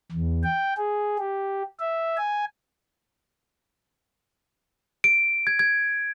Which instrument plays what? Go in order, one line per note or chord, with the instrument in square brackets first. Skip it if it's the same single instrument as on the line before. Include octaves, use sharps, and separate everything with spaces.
[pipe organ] E2
G5
G#4
G4
E5
G#5
[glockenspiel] D7
G#6
G#6